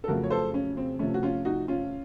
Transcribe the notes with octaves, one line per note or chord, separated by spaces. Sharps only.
A4
F2 C#3 F#3 A3 F#4 A#4
C#5
A4 C5
C#4
C4
C3 F3 A3 C#4
F#4
C#4 F4
D#4 F#4
C#4 F4